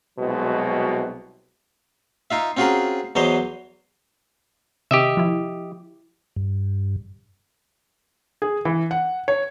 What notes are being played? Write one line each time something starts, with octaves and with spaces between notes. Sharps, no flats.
C2 B2 F#3 G#3
D#4 F4 E5
C4 C#4 F4 F#4 G#4 A#4
E2 E3 F#3 C5 C#5 D#5
C3 D#3 G4 D#5 E5
F3 E4
G2
G#4
E3
F#5
C#5